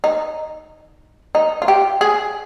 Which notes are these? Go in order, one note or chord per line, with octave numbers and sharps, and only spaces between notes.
D#4
D#4
F4
G4
G#4